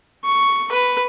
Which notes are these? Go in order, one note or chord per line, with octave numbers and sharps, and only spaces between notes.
C#6
B4